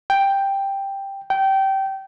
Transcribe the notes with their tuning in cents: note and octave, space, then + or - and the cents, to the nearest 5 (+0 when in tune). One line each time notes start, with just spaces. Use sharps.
G5 +5
G5 -20